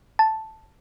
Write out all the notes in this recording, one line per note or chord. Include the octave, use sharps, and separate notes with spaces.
A5